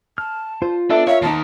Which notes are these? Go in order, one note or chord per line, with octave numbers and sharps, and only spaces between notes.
A5 F6
F4 C5
B3 D4 A4 E5
A#4 C#5 E5 F5
D#2 D#4 A5